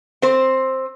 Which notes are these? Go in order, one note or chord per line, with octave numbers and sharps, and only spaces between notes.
C4 C5